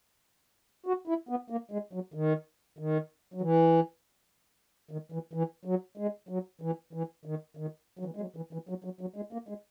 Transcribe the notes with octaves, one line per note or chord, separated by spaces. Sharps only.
F#4
E4
B3
A#3
G#3
F#3
D#3
D#3
F#3
E3
D#3
E3
E3
F#3
G#3
F#3
E3
E3
D#3
D#3
F#3
E3
G#3
F#3
E3
E3
F#3
F#3
F#3
G#3
A#3
G#3